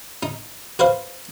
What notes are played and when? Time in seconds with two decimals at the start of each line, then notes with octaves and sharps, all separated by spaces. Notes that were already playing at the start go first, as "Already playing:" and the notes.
0.23 D#4
0.79 F#4 B4 C5 F5